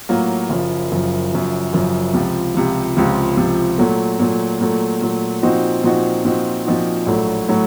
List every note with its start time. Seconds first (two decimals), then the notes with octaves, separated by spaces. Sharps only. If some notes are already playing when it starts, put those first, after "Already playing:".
0.09 A2 F#3 A#3 F4
0.50 F#1 F#2 F3
0.92 F#1 F#2 F3
1.32 F#1 F#2 F3
1.73 F#1 F#2 F3
2.13 C#2 C3 F3
2.54 C#2 C3 F3
2.97 C#2 C3 F3
3.37 C#2 C3 F3
3.78 A#2 F#3 A3
4.19 A#2 F#3 A3
4.61 A#2 F#3 A3
5.01 A#2 F#3 A3
5.43 A#2 F3 C4 D#4 F#4
5.83 A#2 F3 C4 D#4 F#4
6.24 A#2 F3 C4 D#4 F#4
6.65 A#2 F3 C4 D#4 F#4
7.06 A#1 A2 F#3 A3
7.48 A2 F#3 A3